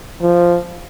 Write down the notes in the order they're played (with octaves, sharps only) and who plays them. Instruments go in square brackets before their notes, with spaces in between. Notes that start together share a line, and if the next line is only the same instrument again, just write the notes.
[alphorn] F3